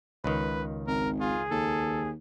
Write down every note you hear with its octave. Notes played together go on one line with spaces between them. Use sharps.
C#2 D#3 B4
G#1 A#4
F4 G#4
D#2 A4